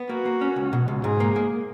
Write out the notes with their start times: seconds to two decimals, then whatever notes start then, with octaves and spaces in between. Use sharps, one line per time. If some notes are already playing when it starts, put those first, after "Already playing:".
Already playing: B3
0.09 A#3 F#4
0.25 A#3
0.41 C#4
0.56 C#2
0.73 B2
0.88 C#2
1.04 G#2 G#4
1.20 A#3
1.36 A#3